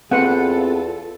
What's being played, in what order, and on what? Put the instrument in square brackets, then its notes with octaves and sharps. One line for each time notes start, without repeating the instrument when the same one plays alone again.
[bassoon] E2 [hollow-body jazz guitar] C4 B4 C5 [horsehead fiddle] F4 A4 [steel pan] F#5